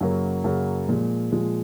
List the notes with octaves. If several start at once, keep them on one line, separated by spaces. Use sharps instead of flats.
F#2 C#3 F#3 A#3
F#2 C#3 F#3 A#3
A#2 F3 G#3
A#2 F3 G#3